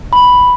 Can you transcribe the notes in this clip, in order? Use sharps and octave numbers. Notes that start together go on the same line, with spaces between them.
B5